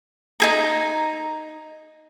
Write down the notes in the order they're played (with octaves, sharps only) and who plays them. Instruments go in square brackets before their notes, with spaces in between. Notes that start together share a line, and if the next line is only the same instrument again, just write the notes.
[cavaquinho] D#4 G#4 A#5